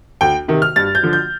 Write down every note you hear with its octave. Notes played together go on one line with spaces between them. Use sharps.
D2 G5
C3 D#3
F6
G2 A6
G6
D3 F3
G6